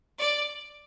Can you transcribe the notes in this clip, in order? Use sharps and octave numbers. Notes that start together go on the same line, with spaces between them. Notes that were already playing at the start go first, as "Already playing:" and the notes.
D5